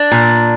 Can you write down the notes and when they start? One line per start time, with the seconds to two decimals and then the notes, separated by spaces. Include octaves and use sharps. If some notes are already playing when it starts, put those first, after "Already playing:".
Already playing: D4
0.12 A#2